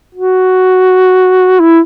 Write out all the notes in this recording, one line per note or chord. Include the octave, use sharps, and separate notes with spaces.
F#4
E4